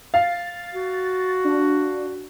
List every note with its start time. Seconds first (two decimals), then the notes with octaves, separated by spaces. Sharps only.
0.14 F5 A6
0.74 F#4
1.44 D4